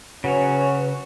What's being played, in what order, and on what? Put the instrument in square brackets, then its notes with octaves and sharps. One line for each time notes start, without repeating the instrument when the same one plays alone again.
[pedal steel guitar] C#3 F#4 C#5 [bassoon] F#3 [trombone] C#4 [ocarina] B4